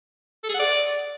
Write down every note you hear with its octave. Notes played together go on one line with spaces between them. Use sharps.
A4
G#4
F#5
D5